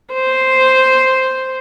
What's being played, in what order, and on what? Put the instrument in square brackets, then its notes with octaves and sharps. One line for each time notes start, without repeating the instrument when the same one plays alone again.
[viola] C5